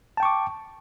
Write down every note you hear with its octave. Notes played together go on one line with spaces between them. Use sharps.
G5 A5 C#6 D6